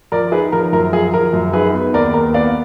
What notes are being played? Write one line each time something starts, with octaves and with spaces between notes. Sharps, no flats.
F3 A#4 D5
D#4 G#4 B4
F3 A#4
F#2 A#4
F3 G#4
F3 A#4
F#2
D#4 G#4 B4
B3
D#2 A#4 D5
D#2 A#4
B3 D5 F5